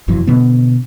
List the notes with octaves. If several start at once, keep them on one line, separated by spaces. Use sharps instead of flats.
E1 F2 E3 F#3
B2 D3 B3